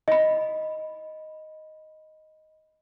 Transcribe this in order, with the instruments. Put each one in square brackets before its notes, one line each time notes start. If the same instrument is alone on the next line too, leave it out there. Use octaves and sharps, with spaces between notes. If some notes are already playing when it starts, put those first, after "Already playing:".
[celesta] D#5 B5